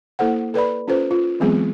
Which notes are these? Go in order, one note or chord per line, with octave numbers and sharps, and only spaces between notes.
A#3 E4 A4 C5 F#5
A4 B4 D5 B5
C#4 F4 A4 B4 C5
F4
E3 F#3 G#3 B3 C4 G#4